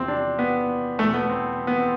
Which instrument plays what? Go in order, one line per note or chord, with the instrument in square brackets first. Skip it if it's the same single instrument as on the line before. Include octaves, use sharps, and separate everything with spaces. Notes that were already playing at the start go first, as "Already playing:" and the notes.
Already playing: [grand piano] E2 C3 F3 C4
D4
B3
E2 B2 A3
B3
C4
B3
C4